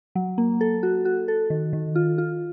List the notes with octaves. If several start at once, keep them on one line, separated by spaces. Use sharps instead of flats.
F#3
A#3
A4
F#4
F#4
A4
D#3
D#3
F4
F4